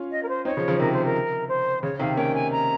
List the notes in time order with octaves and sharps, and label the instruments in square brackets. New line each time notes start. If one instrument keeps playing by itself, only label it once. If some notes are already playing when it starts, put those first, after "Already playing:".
Already playing: [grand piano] C#4 F4
[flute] D#5
A#4
C5
[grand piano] C4 D#4 [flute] C#5
[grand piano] C#3 F3
C#3 F3
[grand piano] C3 D#3 [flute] A#4
[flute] C5
A#4
C5
[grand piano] C#3 [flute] C#5
[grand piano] C3 D#3 [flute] F5
[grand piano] A#3 C#4 [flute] G5
[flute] G#5
A#5